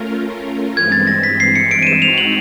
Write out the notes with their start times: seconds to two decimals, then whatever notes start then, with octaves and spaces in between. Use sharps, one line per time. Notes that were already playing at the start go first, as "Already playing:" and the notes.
Already playing: A3 C#4 F4 A#4
0.77 G2 E3 G#3 C4 G#6
0.92 A6
1.07 A#6
1.23 B6
1.40 C7
1.55 C#7
1.71 D7
1.82 D#7
1.87 E7
2.02 G#3 C4 D#4 F#4 F7
2.18 F#7